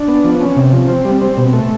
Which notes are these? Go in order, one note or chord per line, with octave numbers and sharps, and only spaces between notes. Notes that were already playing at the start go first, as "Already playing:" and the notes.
Already playing: D4
B3
F3
C#4
C3
F3
C4
G3
C4
B2
A3